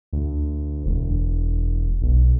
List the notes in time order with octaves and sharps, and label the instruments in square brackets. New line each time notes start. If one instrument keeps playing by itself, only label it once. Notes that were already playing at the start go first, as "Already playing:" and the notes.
[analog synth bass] D2
E1
B1